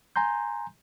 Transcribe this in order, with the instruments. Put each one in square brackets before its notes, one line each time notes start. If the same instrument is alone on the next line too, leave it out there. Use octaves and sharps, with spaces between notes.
[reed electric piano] G#5 A#5 C6 G6